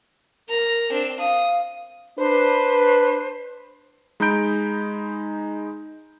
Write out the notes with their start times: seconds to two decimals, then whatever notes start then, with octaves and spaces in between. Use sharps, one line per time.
0.49 A#4 A#5
0.90 C4 D4
1.20 F5 D#6
2.18 D4 B4 C5
4.20 G#3 D#4 A#5 B5 G6 D7